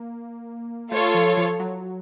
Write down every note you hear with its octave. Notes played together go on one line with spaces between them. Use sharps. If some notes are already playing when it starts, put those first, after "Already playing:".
Already playing: A#3
A3 F4 A4 C#5
F3
F3
F#3